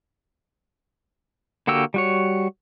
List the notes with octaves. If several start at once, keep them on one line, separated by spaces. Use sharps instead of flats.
D3 A#3 F#4 G4 E6
G3 F#4 C#5